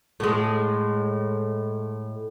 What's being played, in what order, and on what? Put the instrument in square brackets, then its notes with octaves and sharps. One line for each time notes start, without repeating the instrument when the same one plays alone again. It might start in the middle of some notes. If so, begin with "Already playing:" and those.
[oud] A2 G#3